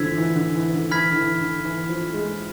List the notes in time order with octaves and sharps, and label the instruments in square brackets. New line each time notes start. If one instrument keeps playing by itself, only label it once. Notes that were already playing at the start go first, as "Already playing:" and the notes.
Already playing: [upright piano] D3 E3 F3 [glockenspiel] E6 G#6 B6
[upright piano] E3
D3
E3
D3
[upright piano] E3 [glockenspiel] B5 F6 G#6 B6
[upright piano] D3
E3
D3
E3
F3
G#3